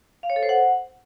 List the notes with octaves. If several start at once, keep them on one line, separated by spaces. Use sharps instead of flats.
F5
C#5
A4
C5
F#5